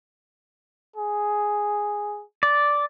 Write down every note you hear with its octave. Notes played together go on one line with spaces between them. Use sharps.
G#4
D5